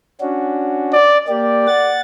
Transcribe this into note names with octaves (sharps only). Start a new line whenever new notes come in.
C#4 D4 F#4
D5
A#3 G4 D5
F#5 A6